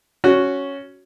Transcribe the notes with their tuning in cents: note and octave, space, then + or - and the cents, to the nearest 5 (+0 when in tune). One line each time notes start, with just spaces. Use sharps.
C#4 +0 F#4 +0